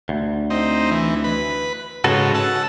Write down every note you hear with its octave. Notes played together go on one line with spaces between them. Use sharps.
D2
C4 D#4
E3
B4
G#2 C#3 F#4 A4 B4
F#5 A5 E6